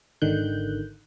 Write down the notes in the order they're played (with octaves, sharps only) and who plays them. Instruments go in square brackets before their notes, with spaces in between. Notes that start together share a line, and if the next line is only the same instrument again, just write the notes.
[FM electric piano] G#1 D3 D#3 F#6 G6